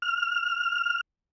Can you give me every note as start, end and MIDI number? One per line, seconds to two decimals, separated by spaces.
0.02 1.01 89